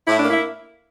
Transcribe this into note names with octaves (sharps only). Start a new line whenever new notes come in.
A2 E4
A#3 D4
E4